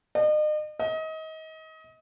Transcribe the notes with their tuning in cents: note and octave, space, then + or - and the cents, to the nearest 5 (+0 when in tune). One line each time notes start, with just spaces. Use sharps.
D#5 -40
D#5 +30